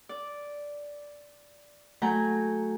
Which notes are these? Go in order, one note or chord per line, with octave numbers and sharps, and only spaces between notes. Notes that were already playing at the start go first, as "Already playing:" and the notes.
D5
F#3 A3 G#5 A#5 G6